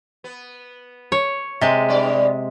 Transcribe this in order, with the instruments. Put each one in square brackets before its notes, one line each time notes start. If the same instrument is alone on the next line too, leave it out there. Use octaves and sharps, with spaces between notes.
[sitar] B3
[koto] C#5
C3 G#3
[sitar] G2 G3 D5